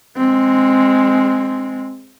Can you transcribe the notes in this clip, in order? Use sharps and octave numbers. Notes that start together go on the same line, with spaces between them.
G#3 C4